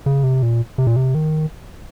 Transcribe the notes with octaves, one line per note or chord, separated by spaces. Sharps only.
C#3
C3
A#2
C3
A#2
C3
D#3